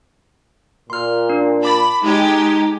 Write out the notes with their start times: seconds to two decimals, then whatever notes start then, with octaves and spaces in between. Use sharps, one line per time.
0.90 A#2 C6 F6
1.29 D4
1.63 A5 B5 D6 A6
2.02 G#3 D#4 G4